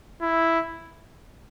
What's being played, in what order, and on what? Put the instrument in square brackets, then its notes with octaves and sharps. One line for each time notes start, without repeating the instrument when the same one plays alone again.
[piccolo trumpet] E4